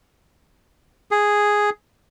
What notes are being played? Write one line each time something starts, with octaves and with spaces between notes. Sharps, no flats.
G#4